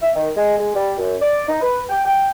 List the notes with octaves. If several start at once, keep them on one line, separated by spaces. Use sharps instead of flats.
E5
D#3
G#3
G#3
G3
F#2
D5
D#4
B4
G5
G5